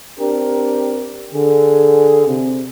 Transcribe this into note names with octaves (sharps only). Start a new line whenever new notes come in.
C4 D4 G4 A#4
D3 G#4
C3